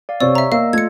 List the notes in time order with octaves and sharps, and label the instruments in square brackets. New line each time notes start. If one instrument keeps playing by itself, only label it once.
[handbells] D5 F5
[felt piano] C3 C4 [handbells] C#5 C#6 E6 [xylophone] D5
[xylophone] E5 A#5
[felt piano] A#3 [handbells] D#5 E6 [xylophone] F5
[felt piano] A3 [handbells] F4 [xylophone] G#6 C#7